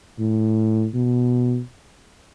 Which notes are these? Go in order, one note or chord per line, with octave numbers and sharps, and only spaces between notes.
A2
B2